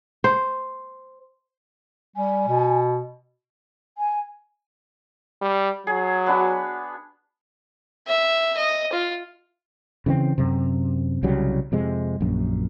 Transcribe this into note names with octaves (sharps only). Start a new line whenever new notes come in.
C5
G3 G#5
B2
G#5
G3
F#3 G#4
B3 D4 F#4
E5
D#5
F4
C#3 E3 G3 C4
F#2 C3
C2 C#3 F#3 G3
F2 C3 G#3
A#1 F#2